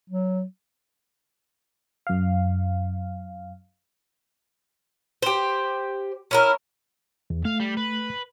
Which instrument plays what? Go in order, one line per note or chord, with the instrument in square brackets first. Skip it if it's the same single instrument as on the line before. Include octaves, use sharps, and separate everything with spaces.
[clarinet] F#3
[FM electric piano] F#2 F5
[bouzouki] G4 C5
C#4 E4 A#4
[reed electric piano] E2
[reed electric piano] A3 [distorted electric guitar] F5
[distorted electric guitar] G3
B4